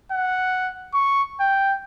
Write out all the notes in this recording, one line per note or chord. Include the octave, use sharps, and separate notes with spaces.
F#5
C#6
G5